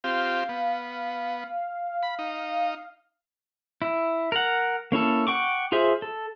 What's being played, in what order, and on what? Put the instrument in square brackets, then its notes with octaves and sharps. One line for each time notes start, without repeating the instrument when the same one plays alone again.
[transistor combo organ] C4 F4 G4 [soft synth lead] F5
[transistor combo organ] B3
B5
D#4
[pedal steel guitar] E4
A#4 F#5
A#3 C#4 E4 A4
F#5 G5 C#6 D6
F4 G#4 C5 E5
A4